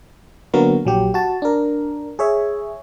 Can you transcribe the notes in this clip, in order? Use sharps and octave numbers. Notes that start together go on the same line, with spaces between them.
D3 F#3 A#3 B3 F#4 A#4
A#1 F#3 G4
F#4 A5
D4 A#4
G#4 C#5 E5